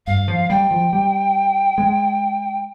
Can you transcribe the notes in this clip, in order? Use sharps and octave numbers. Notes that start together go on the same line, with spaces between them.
G2 F5
F3
G3 G5
F3
G3
G#3